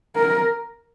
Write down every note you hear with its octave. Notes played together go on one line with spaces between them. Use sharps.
A#4